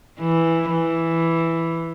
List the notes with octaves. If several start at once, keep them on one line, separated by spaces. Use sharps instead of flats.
E3
E3